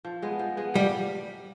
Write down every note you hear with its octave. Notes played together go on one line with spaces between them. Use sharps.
F3
G#3 B3
F3
G#3 B3
F3 G3